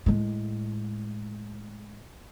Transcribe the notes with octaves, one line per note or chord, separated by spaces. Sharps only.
A2 G#3